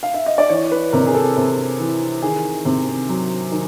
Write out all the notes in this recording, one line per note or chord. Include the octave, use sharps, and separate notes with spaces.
F5
E5
D#5
D5
E3 C#5
B4
C3 A#4
G#4
A4
C3
E3
D#3 G#4
C3
F#3
D#3